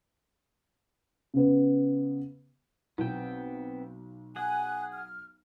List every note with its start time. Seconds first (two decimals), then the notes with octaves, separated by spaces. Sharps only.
1.34 C#3 B3
2.98 B1 B3 C4 G5
4.36 G#4 F#5 G#5 F#6
4.93 F6